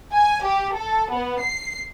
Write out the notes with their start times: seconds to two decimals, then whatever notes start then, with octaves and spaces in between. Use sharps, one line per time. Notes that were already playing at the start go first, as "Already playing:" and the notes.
0.15 G#5
0.44 G4
0.76 A4
1.12 B3
1.43 C7